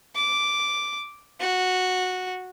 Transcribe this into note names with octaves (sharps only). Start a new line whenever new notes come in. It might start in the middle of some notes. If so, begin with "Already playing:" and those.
D6
F#4